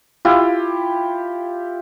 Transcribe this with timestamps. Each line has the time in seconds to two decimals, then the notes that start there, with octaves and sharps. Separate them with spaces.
0.25 E4 F4 G4